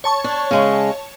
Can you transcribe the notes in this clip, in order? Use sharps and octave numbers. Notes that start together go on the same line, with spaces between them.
C#5 A5 C#6
D4
C#3 G#3